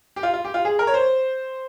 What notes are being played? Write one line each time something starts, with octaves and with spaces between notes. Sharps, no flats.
G4
F4
F4
G4
F4
G#4
A#4
C#5
C5